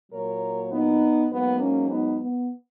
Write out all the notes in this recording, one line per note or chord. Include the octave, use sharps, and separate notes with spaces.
A#2 F#3 A#3 A#4 C#5
B3 D#4
G#2 F#3 A#3 B3
A#3 C#4
B3 D#4
B3